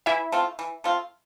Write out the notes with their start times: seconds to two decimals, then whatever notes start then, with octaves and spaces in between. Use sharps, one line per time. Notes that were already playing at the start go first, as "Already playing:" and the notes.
0.06 E3 E4 E5
0.32 A3 C4 F4
0.59 E3
0.84 A3 C4 F4